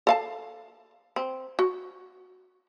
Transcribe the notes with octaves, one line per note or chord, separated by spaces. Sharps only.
A4 F5 A5
C4
F#4